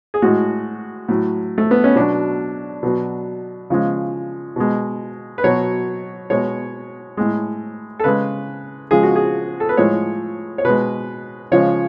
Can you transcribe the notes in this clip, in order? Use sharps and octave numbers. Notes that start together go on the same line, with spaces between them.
G#4
A2 G#3 F#4
A2 F#3
A3
B3
C#4
B2 F#3 D4
B2 F#3
C#3 F3 G#3
B2 G#3
B4
B2 F#3 C#5
B2 G#3 C#5
A2 G#3
A4
C#3 G#3 B4
C#3 F3 G#3 G#4
F#4
G#4
A4
B4
A2 F3 G#3 C#5
C#5
B2 G#3 B4
C#3 F3 G#3 C#5